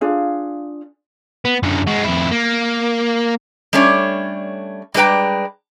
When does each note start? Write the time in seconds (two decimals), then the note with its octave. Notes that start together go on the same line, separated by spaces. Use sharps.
0.01 D4 F4 G#4 F5
1.45 B3
1.63 F#2 D3
1.87 G#3 F#4
2.04 F2 E4
2.31 A#3
3.73 G3 A3 C#4 D4 C#5
4.94 G3 G#3 D4 B4 G5 A#5